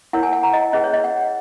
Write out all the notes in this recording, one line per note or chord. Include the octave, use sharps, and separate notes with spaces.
E4 A#4 C#5 F#5
G#5
F#5
A#5
D#5
C#4 G#4 B4 D#5
C#5
D#5
F#5